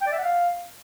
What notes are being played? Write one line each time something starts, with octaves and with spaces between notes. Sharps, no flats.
G5
D5
E5
F#5
F5